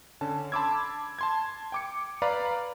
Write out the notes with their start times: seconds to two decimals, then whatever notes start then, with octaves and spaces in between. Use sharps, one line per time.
0.21 D3 C#4 A5
0.52 A5 B5 C6 D6 E6 G#6
1.19 A5 C6 G#6
1.72 G5 D6 C#7
2.22 B4 D5 F5 A#5 B5